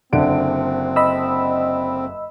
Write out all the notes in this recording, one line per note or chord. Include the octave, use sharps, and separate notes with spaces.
F#1 D3 C4 D7
D#5 B5 E6